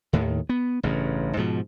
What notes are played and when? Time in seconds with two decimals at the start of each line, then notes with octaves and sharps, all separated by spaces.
0.13 D#2 A2 D#3
0.49 B3
0.83 A1 G2 C#3
1.37 G#2 B2 F3